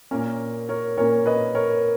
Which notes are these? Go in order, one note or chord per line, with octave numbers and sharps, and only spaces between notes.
A#2 A#3 C#4 A#4
A#4 C#5
A#2 A#3 C#4 A#4 C#5
B4 D#5
A#4 C#5